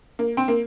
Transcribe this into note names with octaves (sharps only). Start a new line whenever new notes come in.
A#3
C4
A#3